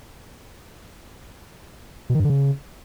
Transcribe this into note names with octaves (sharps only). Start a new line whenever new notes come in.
B2
D#3
G2
D3
C#3